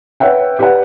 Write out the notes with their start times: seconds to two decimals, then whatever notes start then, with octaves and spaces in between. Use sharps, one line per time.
0.20 B4 C#5 E5 F#5 G5
0.59 G4 B4 D5 F#5